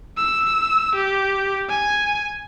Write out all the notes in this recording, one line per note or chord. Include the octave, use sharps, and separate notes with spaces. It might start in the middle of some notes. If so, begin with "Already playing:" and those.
E6
G4
G#5